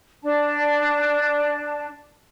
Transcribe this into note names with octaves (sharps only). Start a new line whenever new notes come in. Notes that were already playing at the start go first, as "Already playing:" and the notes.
D4 A5